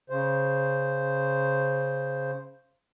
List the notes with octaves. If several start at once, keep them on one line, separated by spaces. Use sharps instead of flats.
C#3 C5